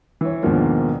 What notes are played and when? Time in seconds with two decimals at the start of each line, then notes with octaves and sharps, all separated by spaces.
0.21 E3 C#5
0.42 D#2 G#2 B2 F3 A#3 D4